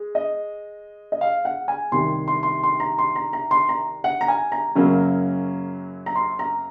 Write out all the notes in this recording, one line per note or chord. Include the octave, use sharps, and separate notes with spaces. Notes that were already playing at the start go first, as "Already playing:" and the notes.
Already playing: G#3
D#5
D#5
F5
F#5
G#5
C2 C3 D#3 C6
C6
C6
C6
A#5
C6
A#5
A#5
C6
A#5
F#5
A#5
G#5
A#5
F#2 C#3 F#3 A#3 C#4
A#5
C6
A#5